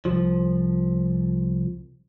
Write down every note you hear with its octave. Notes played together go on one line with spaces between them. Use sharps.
C2 F3